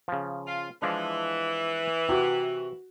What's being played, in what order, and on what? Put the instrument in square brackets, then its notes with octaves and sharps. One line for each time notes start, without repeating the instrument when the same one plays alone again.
[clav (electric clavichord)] C#3 F3
[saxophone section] F4
[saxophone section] E3 [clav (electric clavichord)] F3 G#3 D4
[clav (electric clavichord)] C3 [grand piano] F#4